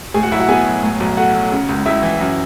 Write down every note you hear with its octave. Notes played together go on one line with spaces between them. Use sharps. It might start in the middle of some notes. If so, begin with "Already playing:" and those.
A2 G#4 G#5
F#4 F#5
B1 E4 E5
F#4 F#5
B3 G#4 G#5
F#3
A2
B1
A3 F#4 F#5
F#3
C#3
C#2
C#2 E4 E5
E3
F#2